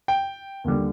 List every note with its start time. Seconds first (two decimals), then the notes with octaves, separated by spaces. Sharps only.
0.08 G5
0.64 D#2 D3 G3